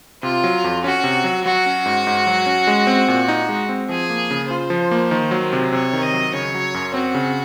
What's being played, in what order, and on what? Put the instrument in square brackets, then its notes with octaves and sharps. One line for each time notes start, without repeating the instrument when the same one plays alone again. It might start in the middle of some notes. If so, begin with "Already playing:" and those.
[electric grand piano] C3 [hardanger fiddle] F4
[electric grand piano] F#3
F2
[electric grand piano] C#4 [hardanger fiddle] F#4
[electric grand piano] C3
F#3
[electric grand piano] F#3 [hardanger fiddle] F#4
[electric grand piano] C#4
G#2
G#2
F#3
C#4
G#3
C4
A#2
D#4
G#3
C4
[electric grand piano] F3 [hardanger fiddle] G#4
[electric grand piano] A#3
C#3
[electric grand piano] F4 [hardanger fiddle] C5
[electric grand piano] F3
A#3
D#3
F#3
C3
[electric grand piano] C3 [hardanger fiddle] C#5
[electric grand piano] D#3
[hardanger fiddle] D#5
[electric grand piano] F#3
[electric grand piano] C#3 [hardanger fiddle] C#5
[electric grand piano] F#3
F#2
[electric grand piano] C4 [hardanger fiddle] F#4
[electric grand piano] C#3